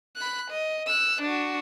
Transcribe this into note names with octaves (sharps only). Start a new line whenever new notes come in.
B5 F#6
D#5
E6 F#6
D4 F#4